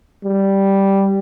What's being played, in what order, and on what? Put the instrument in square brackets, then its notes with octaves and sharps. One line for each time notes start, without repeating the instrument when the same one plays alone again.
[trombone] G3